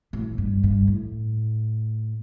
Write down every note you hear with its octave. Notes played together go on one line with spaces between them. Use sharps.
A2
G2
G2
A2